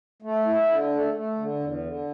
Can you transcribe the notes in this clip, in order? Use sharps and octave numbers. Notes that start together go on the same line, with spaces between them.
A3
E4
D3
A3
A3
D3
E2
D3